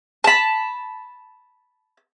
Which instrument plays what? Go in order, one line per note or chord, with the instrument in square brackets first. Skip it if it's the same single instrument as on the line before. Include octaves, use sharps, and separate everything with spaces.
[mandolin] A5 B5